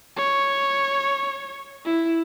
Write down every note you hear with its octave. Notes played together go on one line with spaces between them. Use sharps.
C#5
E4